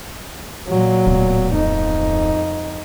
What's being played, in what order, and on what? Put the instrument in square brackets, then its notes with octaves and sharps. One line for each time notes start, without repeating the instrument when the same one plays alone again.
[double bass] A#2 F#3
[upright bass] D1 B3
[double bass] F2 D#4